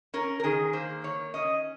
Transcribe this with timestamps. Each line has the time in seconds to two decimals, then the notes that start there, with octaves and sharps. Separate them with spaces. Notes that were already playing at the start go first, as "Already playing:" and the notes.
0.14 C#4 A#4
0.40 A#4
0.44 D#3 G#4
0.73 A#3 C5
1.04 D#3 C#5
1.34 C#4 D#5